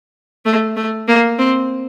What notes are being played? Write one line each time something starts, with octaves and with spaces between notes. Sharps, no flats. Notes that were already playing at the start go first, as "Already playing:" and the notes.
A3
A3
A#3
C4